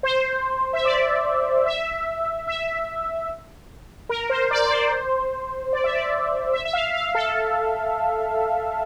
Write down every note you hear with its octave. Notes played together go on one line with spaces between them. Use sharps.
C5
E5
D5
E5
E5
A#4
C5
D5
D5
C5
D5
E5
D5
E5
E5
F5
F5
A4